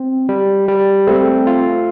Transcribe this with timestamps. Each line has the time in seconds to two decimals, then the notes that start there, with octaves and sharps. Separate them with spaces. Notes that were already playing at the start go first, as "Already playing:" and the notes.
Already playing: C4
0.29 G3
0.68 G3
1.07 A3 C4
1.47 F4